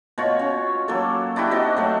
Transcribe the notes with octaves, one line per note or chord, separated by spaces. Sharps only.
B2 F4 C#5
C#4
F#3 A#3 A4
D4 E4 F#4 G4
C4 D#4 F#4 D#5
F#3 A3